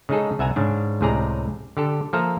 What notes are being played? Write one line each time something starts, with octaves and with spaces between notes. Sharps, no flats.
C#3 G#3 D#4 G#4 A4
C2 E5 F#5 G#5 A#5
G#2 C#3 D4
C#2 A2 C3 G#4 D5 A#5
D3 G4 A4
F3 A#3 A4 E5 F5 A#5